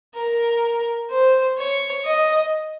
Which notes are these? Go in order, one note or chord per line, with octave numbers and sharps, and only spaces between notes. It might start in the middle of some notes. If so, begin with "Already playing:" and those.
A#4
C5
C#5
D#5